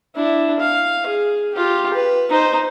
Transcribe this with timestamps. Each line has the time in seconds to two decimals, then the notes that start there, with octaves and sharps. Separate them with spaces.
0.15 D4 E4
0.59 F5
1.06 G#4
1.54 F4 G4
1.94 B4
2.29 D#4 C5